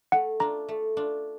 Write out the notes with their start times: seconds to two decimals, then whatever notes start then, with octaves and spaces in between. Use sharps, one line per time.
0.12 A3 F#5
0.40 D4 F4 A#5
0.68 A3
0.97 D4 F4